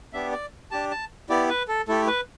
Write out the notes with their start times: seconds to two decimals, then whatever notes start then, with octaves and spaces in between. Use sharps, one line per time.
0.13 B3 D4 G4 E5
0.32 D5
0.71 D4 G4 A5
0.91 A5
1.29 B3 E4 G4 D5
1.49 B4
1.68 A4
1.88 A3 E4 G4 A4
2.07 B4